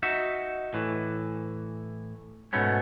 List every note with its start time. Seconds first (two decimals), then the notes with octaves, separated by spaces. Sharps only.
0.03 D#4 F#4 E5
0.74 A2 E3
2.53 G#2 B2 A3 B3 C#4